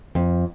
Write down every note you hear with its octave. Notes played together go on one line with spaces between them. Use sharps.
F2